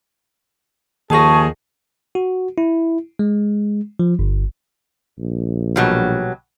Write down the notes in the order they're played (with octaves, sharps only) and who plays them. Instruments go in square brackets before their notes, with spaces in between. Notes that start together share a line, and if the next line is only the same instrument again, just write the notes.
[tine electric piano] D#2 A#6 [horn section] D#3 F3 G#4 [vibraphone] A5 C#6
[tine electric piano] F#4
E4
G#3
F3
G1
[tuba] A#1
[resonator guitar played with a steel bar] B2 F#3 G3